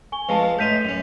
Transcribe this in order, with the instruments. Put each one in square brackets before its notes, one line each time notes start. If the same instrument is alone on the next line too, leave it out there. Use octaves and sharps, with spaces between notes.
[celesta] G#5 C#6 G7
[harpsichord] F2 F3 G#3 [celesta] B4 A5
[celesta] B4
[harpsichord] A2 D#4 C6 [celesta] G6 B6 D#7
[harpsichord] F#2 C#4